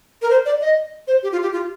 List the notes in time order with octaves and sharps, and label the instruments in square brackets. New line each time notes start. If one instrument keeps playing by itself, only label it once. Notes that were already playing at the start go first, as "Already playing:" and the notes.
[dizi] A#4
C5
D5
D#5
C5
G4
F4
G4
F4